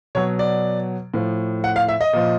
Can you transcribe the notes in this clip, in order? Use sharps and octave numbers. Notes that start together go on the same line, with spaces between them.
B2 F#3 C#5
D5
A2 F3
F#5
F5
E5
D#5
A#2 F3